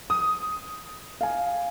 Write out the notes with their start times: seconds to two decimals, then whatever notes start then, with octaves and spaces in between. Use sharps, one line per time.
0.10 D#6
1.21 F5 G#5